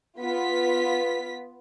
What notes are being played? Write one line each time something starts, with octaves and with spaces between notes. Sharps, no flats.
B3 F4 B6